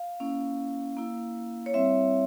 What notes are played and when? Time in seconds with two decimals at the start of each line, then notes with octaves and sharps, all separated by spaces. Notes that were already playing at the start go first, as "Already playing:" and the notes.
Already playing: F5
0.20 A#3 C#4 E4
0.97 A#3 E4
1.66 C#5
1.74 G3 C4 E4 E5